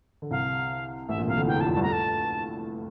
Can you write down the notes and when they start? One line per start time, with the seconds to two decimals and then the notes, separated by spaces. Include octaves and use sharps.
0.22 D3
0.30 C2 C3 F5
1.08 A1 A2 E5
1.18 A#1 A#2
1.27 C2 C3 F5
1.37 D2 D3
1.47 E2 E3 G5
1.56 F2 F3
1.60 A5
1.66 F2 F3
1.73 G2 G3 A5
1.82 A2 A3 A#5
1.92 A5